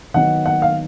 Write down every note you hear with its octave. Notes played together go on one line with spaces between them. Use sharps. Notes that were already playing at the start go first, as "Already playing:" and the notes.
D#3 F#3 B3 F#5
F#5
F5